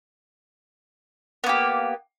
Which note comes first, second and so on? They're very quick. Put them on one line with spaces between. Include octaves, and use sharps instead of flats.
B3 A#3 G4